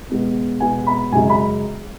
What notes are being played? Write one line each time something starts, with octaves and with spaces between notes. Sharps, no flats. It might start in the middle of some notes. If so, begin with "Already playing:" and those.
B2 G#3 B3
B2 G#3 B3 G#5
B5
F#2 C#3 G#3 G#5
B5